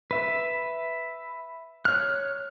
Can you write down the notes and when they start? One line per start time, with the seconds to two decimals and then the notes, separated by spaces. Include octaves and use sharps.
0.11 B4 E5
1.85 C#5 F6 F#6